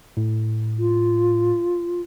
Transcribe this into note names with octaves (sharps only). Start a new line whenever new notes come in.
A2
F4